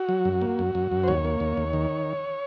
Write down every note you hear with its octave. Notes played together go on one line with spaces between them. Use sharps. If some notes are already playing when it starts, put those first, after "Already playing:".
Already playing: F#4
F#3
F#2
A#3
F#2
F#2
F#2
C5
D#2 C#5
A#3
D#2
D#2
D#3